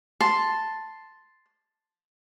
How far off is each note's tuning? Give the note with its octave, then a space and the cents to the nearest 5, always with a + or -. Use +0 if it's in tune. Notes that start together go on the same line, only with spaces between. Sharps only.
A5 +0 C6 +0